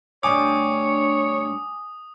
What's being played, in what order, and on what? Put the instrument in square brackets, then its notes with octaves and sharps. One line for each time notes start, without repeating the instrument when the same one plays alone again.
[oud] D2 G2 G3 [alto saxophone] C#5 [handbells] G#5 D6 [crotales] D#6